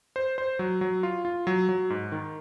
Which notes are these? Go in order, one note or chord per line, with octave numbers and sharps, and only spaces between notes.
C5
C5
F#3
F#3
F4
F4
F#3
F#3
G#2
D#3